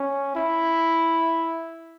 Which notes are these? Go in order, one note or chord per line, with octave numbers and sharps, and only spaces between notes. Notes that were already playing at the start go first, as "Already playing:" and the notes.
Already playing: C#4
E4